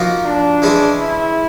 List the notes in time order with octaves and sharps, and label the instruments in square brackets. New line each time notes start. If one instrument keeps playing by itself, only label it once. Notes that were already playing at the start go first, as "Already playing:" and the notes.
Already playing: [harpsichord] F3 A#3 D#4 F#4 A#4
[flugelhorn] D4
[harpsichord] E3 G#3 C#4
[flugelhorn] E4